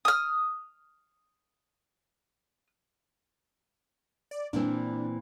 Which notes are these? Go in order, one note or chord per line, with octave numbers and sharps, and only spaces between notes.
D#6 F6
D5
A#2 E3 C4 D4